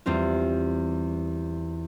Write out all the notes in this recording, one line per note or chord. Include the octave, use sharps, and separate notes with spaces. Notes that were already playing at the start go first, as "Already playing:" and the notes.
E2 G3 C4 F4